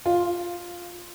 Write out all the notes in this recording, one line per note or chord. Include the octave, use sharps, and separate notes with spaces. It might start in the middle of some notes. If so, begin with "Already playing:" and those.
F4